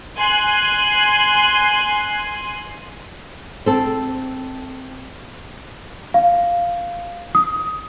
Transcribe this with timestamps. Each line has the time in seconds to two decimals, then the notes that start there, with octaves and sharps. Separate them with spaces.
0.17 G#5 C6 F#6
3.66 C4 A4
6.14 F5
7.35 D#6